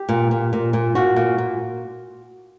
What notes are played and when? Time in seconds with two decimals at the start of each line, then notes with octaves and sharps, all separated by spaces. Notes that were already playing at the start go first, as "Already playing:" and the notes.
Already playing: G4
0.09 A#2
0.31 A#2
0.53 A#2
0.73 A#2
0.95 A#2 F#4
1.16 A#2
1.38 A#2